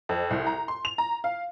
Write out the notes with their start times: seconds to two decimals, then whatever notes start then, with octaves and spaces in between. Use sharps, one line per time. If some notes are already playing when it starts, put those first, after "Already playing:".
0.09 F2
0.30 C2
0.47 A#5
0.68 C6
0.85 F7
0.98 A#5
1.24 F5